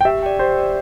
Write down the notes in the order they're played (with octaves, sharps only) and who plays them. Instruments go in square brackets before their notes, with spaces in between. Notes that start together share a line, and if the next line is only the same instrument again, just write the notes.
[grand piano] G5
[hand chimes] G4 [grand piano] E5
[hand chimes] D5 G5
[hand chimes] G4 [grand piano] C5
[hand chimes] D5 G5